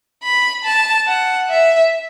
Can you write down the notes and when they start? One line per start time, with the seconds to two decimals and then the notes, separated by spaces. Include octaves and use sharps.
0.23 B5
0.65 A5
1.07 F#5
1.50 E5